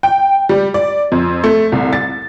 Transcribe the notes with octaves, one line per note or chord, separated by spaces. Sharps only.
G5
G3
D5
F2
A3
C2
A6